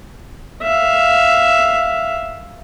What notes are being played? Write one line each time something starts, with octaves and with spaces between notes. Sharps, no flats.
E5 F5